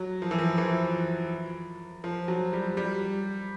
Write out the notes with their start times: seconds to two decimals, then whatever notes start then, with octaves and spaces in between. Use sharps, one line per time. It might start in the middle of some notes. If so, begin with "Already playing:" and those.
Already playing: F#3
0.22 F3
0.31 E3
0.38 F3
0.58 E3
2.04 F3
2.28 F#3
2.53 G3
2.77 G3